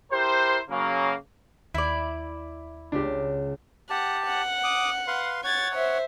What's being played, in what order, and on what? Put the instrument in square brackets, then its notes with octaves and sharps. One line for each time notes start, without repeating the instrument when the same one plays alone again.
[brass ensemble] E4 G4 A#4 C5
C#3 F#3 A#3
[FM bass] D#2 [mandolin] E4 D5
[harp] C#2 [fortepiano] D4 G4
[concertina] G4 A5 [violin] F#5
[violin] F#5
[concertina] D6 D#6
B4 F5 C6
[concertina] C#5 F#5 [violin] G#6 A6
[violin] C5 E5